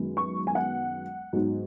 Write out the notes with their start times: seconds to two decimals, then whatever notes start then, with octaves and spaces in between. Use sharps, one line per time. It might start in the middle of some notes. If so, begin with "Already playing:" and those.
Already playing: F#2 D#3 G#3 B3
0.17 C#6
0.47 G#5
0.55 F#5
1.33 G#2 F#3 B3